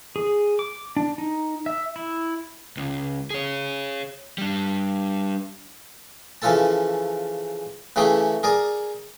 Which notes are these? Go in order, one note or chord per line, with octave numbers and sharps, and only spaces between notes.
G#4
D6
D4
D#4
E5
E4
C#2
G#4 C#5
G3 D4
C#3 E3 F3 F4 A4 A5
C#3 E3 A3 G4 G#4 G5
G#4 A#4 D5 G#5